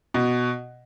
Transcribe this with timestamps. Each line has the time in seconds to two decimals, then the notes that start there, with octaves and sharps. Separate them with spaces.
0.14 B2